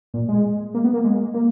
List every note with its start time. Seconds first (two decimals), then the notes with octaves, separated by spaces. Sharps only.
0.14 A#2
0.29 G#3
0.74 A#3
0.84 B3
0.94 A#3
1.05 G#3
1.34 A#3